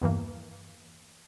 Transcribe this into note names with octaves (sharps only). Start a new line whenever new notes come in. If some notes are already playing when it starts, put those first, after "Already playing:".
E2 G2 E3 A#3